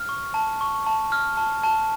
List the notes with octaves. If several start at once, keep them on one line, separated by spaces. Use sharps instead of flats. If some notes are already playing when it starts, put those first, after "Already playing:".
Already playing: F6
C#6
A5
C#6
A5
F6
A5
A5